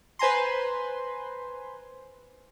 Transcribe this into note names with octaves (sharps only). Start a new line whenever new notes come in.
B4 C5 G#5 A#5 C6